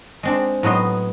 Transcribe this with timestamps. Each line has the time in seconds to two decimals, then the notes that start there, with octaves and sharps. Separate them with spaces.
0.23 G#3 C4 D4
0.63 A2 F#3 B3 D#5 C6